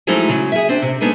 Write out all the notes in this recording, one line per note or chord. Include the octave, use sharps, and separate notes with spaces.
F3 F#3 G#3 A3 D#4 E4
C#3 F#3
G#4 E5
C4 D4 C5
C3
G#3 A3 B3 D4 D#4